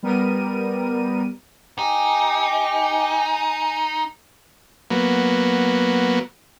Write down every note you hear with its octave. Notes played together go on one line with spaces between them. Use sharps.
G3 B3 A#4 D#7
D#4 G4 G#5
F#3 A#3 B3